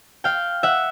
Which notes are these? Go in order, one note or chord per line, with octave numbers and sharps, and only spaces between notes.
F5 G5
E5 F#5